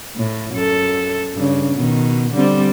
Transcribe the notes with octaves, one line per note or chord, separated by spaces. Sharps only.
A2
F#2 A4
G2 C#3
B2 D#3
D3 G3 C4